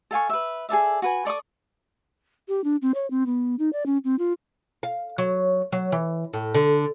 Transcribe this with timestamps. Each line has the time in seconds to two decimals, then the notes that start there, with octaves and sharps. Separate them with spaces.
0.11 A4 F5 G#5 C#6
0.29 B4 E5
0.69 G#4 A4 D5 E5
1.02 F#4 B4 G#5
1.25 A4 D5 C#6 D#6
2.48 G4
2.64 D4
2.82 C4
2.95 C#5
3.10 C4
3.26 B3
3.59 D#4
3.73 D5
3.86 C#4
4.04 C4
4.19 F4
4.83 F5
5.18 F#3
5.72 F#3
5.92 E3
6.33 A2
6.55 D3